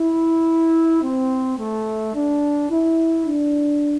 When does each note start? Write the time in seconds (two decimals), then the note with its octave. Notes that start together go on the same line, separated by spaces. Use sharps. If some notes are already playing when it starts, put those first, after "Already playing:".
Already playing: E4
1.02 C4
1.58 A3
2.15 D4
2.69 E4
3.26 D4